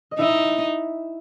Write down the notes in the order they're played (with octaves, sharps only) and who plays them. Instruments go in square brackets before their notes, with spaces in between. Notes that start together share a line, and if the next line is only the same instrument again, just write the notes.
[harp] D#5
[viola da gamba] D#4 [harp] E4 E5